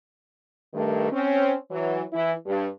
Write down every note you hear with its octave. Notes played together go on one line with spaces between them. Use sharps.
G2 D#3 A3
C4 C#4
E3 F#3
E3 E4
G2